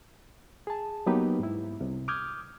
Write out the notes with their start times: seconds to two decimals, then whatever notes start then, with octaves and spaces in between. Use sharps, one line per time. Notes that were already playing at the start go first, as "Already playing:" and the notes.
0.67 G#4 A5
1.06 F#3 A#3 B3 D#4 G4 B4
1.39 G#2 E4
1.81 C2 C3
2.08 D6 D#6 F6 G6 G#6